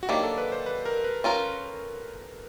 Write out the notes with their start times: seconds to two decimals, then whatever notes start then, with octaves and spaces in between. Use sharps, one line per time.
0.03 F#4
0.09 D#3 F#3 A#3 D4 G4
0.23 A4
0.38 B4
0.52 C5
0.66 B4
0.85 A#4
1.04 B4
1.24 C#4 F4 A#4